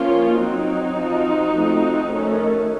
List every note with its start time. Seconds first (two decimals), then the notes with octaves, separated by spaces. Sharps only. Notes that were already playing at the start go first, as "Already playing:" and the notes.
Already playing: F3 A#3 C#4 F4
0.37 F#3 C4 D#4 F#4
0.96 F3 C4
1.53 F3 A3 C4
2.11 D#3 A3 C#4